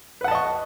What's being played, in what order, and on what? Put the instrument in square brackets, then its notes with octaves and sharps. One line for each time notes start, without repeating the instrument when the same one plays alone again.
[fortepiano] B4
F#5
A5
D#5
C#6